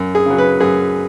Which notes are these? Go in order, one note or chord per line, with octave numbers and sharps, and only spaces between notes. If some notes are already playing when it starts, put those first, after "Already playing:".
Already playing: F#2
G#4
C#3 F#3
B4
F#2 G#4